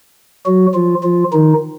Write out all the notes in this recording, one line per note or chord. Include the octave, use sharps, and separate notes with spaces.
F#3 F#4
F3 F4
F3 F4
D#3 D#4